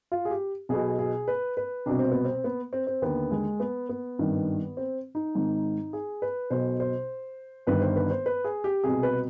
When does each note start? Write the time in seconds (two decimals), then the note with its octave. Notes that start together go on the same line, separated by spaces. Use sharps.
0.12 F4
0.25 G#4
0.30 G4
0.69 B1 B2 G#4
0.99 G#4
1.28 B4
1.57 B4
1.86 C2 B2 D4
1.99 C4
2.12 B3
2.25 C4
2.44 B3
2.73 C4
2.87 C4
3.02 D#2 D3 B3
3.31 G#3
3.60 B3
3.89 B3
4.18 G#1 G2 D#3
4.77 C4
5.15 D#4
5.35 G#1 G#2 D#3
5.93 G#4
6.22 B4
6.50 B1 B2 C5
6.80 C5
7.67 G1 G2 D#3 B4
7.82 C5
7.96 B4
8.11 C5
8.26 B4
8.44 G#4
8.64 G4
8.84 C2 B2 G#4
9.03 B4